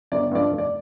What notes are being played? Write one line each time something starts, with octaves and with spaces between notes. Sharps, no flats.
G1 D5
G2 F3 D5
F1
D5